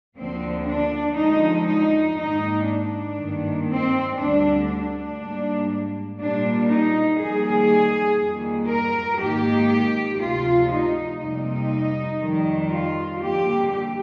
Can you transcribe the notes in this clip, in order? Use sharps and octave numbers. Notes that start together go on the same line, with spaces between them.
D2 D3 F3 A#3 C4
D4
F2 D3 F3 G#3 D#4
D#4
G#2 D#3 A#3 D#4
D4
G2 D#3 A#3
C4
D2 D3 G3 D4
D4
G#2 G3 A#3
A#2 G3 A#3 D4
D#4
F2 D#3 G3 A#3 G#4
F2 D#3 G3 A#3
A#4
G#2 D#3 A#3 G4
D2 C3 F3 F4
D#4
F2 C3 G3 A#3 D#4
F2 D#3 G3
F4
F2 D3 G3 A#3 G4
G4